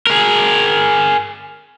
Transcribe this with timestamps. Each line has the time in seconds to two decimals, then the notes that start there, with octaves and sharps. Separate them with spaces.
0.07 G#4 A#4